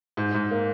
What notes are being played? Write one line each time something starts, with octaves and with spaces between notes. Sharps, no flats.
G#2
G#2
A#3